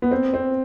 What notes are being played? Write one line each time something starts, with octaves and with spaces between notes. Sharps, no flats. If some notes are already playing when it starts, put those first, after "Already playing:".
B3
C4
C4